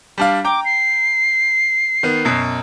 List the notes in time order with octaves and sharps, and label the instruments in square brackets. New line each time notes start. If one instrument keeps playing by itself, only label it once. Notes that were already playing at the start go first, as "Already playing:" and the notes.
[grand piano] G3 D4 F5
[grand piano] G5 A#5 [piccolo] D6
[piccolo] C7
[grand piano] D#3 B3
F#2 B2